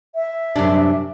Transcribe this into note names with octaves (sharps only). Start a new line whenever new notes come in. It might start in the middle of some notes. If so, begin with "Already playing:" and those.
E5
F#2 C3 D4